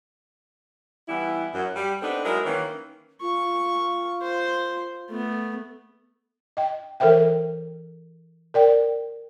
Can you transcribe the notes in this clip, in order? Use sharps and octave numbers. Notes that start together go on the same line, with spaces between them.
E3 G3 B3 E4
F#2 F#3
G3
B3 C4 D4 D#4 A4
F#3 G#3 E4 A#4
D#3 E3 A#3 C#4
F4 C#6
C5
A3 B3
D#5 G5
E3 A4 A#4 C5 E5 G5
A#4 D5 G5